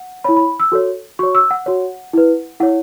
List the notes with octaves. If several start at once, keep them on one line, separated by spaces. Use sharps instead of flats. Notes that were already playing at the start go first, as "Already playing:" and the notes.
Already playing: F#5
E4 C#5 B5
B5
E6
F#4 A4 C#5
F#4 C#5 C#6
E6
F#5
F#4 C#5
E4 B4
E4 C#5 F#5